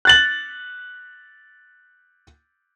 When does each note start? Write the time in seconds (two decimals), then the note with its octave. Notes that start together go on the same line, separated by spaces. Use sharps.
0.05 F#6 A6 F#7